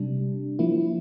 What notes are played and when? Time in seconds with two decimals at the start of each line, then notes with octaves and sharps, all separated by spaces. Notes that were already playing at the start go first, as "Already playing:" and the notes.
Already playing: C3 G3 D4
0.59 F3 A#3 E4